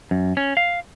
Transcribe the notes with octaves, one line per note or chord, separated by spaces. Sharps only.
F#2
C#4
F5